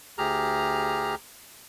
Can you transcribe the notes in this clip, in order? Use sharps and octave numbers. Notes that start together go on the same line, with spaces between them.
D2 G4 G#4 A#5 F6